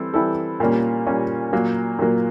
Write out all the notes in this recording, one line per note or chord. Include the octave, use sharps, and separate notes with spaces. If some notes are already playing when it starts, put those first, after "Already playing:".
Already playing: E3 G3 C4 E4 A4
E3 G3 C4 E4 A4
A#2 G3 A#3 C#4
A#2 G3 A#3 C#4
A#2 F#3 A#3
A#2 F#3 A#3